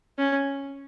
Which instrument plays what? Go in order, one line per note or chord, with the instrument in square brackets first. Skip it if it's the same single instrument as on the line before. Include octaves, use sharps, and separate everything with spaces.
[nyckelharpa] C#4